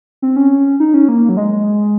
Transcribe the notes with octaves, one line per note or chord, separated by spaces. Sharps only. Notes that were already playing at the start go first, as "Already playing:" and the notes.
C4
C#4
D#4
C#4
A#3
F#3
G#3